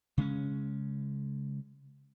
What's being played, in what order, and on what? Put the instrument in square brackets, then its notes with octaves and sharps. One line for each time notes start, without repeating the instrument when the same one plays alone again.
[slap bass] C#3 G#3 C#4